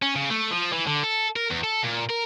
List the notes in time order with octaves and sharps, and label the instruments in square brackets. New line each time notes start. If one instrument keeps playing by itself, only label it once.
[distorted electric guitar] C#4
C#3
A3
F3
E3
D3
A4
A#4
E2
A4
A#2
A#4